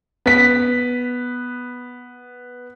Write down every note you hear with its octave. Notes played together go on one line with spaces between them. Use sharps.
B3 B6